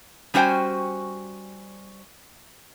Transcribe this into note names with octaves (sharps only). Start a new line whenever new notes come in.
G3 C#4 F#4 C5 G5 G#5